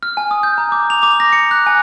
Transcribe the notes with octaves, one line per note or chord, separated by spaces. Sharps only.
F6
G#5
D#6
G6
A#5
D6
F7
D6
A#6
C#7
F#6
G#5